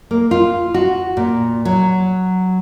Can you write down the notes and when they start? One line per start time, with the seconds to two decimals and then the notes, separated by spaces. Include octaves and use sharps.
0.11 A#3
0.31 F4
0.74 F#4
1.17 A#2
1.65 F#3